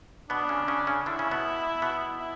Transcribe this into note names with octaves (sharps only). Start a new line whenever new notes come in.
B2 B3 D4
C#3 C#4
C#3 C#4
C#3 C#4
D3 D4 E4
C#3 C#4
B2 B3
B2 B3
E4